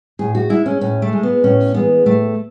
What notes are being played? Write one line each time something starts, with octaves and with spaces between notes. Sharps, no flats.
A2 G#4
F#4
G#3 E4
C#4
A2 C#4
A3
G#3
B3
A2 C#4
E3 G#3 B3
A2 A3